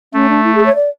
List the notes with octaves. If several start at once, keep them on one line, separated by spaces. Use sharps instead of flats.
A3 C#4
D4
E4
G#4
C#5
D5